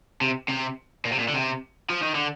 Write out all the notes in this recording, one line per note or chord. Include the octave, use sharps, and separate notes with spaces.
C3
C3
A#2
C3
A#2
D3
C3
F3
D#3
D3